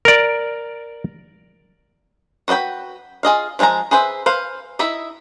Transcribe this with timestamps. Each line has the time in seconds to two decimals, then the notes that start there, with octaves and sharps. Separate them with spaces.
0.05 A#4 D5
2.48 F#4 B4 D#5 G5 B5
3.23 F4 G#4 D#5 F5
3.59 F3 G#3 F4 G#5 A#5
3.91 G#4 B4 C5 E5
4.26 B4 C5 F5
4.79 D#4 E4 D#5 E5